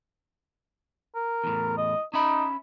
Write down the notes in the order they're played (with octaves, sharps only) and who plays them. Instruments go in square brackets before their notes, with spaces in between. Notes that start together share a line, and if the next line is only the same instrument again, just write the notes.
[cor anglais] A#4
[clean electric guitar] E2 A2
[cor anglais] D#5
[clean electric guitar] C#4 E5 B5 [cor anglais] D#4